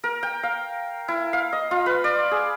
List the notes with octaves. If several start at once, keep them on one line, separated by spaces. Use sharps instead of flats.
A#4
G5
F5
E4
F5
D#5
F4
B4
D5
G#4